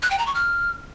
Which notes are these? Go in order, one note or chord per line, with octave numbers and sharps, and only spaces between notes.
F#6
G5
A#5
C#6
F6